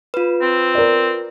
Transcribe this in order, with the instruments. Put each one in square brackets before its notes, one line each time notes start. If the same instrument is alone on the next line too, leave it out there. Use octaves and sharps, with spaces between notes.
[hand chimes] F4 B4
[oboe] C4
[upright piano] A#4 D5